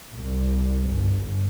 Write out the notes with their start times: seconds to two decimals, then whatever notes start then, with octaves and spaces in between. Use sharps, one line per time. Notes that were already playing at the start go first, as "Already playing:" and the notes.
0.12 C2
0.85 G1
1.17 G1